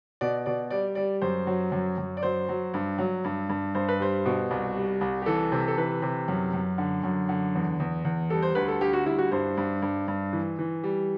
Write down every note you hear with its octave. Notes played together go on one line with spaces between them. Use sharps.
B2 D5
B2 D5
G3 D5
G3 D5
F#2 C5
F#3
F#2
F#2
D5
F#3 C5
F#3
G2
F#3
G2
G2
G2 C5
B4
G3 C5
B2
C2
G3
C2
G4
E3 A4
C3
A4
E3 B4
C3
F#2
F#2
D3
F#2
D3
E2
E2
E2
G3 A4
C5
D2 B4
A4
D2 G4
F#4
G3 E4
F#4
G2 C5
G2
G2
G2
E3
E3
G3